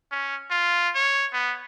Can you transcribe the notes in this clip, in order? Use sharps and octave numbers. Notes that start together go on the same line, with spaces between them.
C#4
F4
C#5
B3